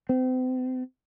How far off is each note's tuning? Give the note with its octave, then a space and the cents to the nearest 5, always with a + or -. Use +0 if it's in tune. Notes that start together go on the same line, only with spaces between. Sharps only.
C4 -40